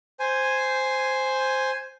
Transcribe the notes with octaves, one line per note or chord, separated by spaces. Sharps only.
C5 G#5